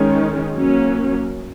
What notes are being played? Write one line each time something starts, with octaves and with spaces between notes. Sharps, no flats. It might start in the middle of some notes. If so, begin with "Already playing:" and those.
Already playing: D#3 G#3 C#4
F#3 A#3 C#4